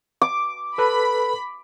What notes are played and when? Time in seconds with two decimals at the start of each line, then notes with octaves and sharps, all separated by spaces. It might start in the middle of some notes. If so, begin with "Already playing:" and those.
0.22 D6
0.78 A4 B4 B5